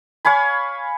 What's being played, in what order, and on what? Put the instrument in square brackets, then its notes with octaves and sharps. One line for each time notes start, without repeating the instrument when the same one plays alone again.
[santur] C#5 F5 G#5 B5